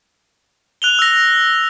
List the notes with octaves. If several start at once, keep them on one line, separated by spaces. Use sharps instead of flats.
F#6 F7 G7
E6 A#6